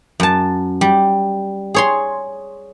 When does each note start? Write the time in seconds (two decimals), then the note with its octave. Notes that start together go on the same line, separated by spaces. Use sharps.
0.20 F#2 A5
0.81 G3
1.74 G#4 C#5 C6